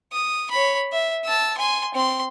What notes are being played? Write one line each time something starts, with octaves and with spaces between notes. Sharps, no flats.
D#6
C#5 B5
E5
A5 E6
G#5 C6
C4 C6